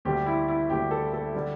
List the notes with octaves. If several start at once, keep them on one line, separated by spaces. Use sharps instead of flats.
D2 D3 G3 G4
E4
E4
D2 D3 G3 G4
A4
A4
D3 G3